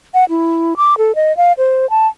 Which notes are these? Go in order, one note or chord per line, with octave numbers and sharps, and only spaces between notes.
F#5
E4
D6
A4
D#5
F5
C5
A5